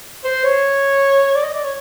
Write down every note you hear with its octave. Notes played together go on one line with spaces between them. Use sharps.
C5
C#5
D5
D#5
D5
C#5